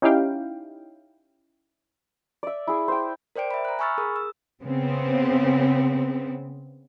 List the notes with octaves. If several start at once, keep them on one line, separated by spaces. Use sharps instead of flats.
C#4 D#4 E4 G4 F5 G5
D5 E5
E4 G#4
C5 G5
A#4 C5 D5 G5 D7
E5 B5
A#5 F#6
G#5 B5 C#6 E6 F6 A6
G#4 A#4 D#6
E6
C#3 B3 C4